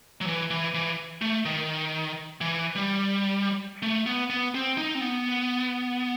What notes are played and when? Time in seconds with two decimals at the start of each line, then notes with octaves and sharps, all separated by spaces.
0.21 F#3
0.26 E3
0.50 E3
0.74 E3
1.22 A3
1.45 D#3
2.41 E3
2.75 G3
3.82 A3
4.06 B3
4.30 B3
4.55 C4
4.78 D#4
4.95 C4
5.01 B3